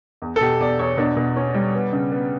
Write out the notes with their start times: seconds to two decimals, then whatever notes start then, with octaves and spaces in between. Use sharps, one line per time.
0.22 E2
0.36 A4
0.41 B2 G4
0.60 E2 D5
0.79 E2 C#5
0.98 B2 D4
1.16 B2
1.36 C#4
1.54 G3
1.74 B3
1.93 C#3
2.12 B3